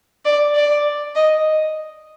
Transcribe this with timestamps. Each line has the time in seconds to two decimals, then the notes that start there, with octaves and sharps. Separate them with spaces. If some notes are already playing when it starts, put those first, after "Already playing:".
0.25 D5
0.55 D5
1.15 D#5